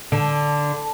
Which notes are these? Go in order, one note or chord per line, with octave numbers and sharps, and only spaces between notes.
D3